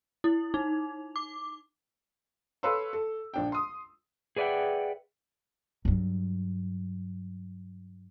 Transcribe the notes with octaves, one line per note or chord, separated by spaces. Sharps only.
E4
D#4
D6
A4 B4 C#5 F5 C6 E6
A4
A#1 D4 G5
C6 D#6
G#4 B4 D5 E5 F#5 G5
G2 F#3